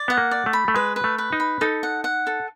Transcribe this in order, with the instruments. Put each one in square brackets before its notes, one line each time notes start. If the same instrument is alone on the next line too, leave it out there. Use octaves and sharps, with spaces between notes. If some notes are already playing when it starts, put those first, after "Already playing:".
Already playing: [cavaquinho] D5
[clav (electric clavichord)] B3 [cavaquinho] F#5
[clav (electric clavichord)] A#3
[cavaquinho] D5
[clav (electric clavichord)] A3
[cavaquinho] B5
[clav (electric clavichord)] A3
[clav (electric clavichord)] G#3 [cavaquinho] B4
[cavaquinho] B4
[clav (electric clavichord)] A3
[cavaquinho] B4
[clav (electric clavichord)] D#4
[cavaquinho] B5
[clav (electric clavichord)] D#4 [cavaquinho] A4
[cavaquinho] F#5
F#5
A4